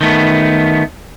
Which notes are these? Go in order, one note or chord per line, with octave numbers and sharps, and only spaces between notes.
D#3 A3 B3